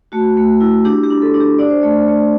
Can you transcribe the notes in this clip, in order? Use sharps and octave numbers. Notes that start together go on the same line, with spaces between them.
A3 F#4
A3
E4
D4 G4
G4
D4
A4
D4
G4
D4 D5
C5
A3 D5
A3